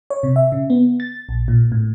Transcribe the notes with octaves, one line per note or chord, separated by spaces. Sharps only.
C#5
C3
E5
C#3
B3
A6
A#1
A#2
A2